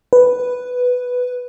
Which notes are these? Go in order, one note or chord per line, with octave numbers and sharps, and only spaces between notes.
B4